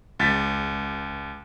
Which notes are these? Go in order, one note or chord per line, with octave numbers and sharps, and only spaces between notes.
C#2 A6 B6